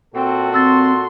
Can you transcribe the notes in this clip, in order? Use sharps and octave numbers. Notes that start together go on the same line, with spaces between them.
A#2 C4 F#4 A4
C4 C6 E6 A6